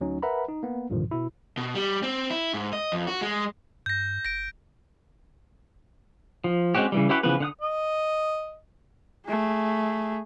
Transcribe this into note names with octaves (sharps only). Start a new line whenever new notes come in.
D2 F#3 C#4 D#4
A#4 B4 E5 F#5 A#5 B5
D#4
A#3 B3
C2 G2 A#2 D3 D#3 F3
B2 E4
B2
G3
C4
E4
G#2
D#5
F2
F#4
G#3
G2 G6 A#6
G1 A#6 D7
F3
G#3 C4 C#4 F#4 G4
C#3 E3 G3
C#4 E4 F#4 G4 B4
C#3 E3 F3 B3 B4
D3 F#5 D#6
D#5
A3 G#4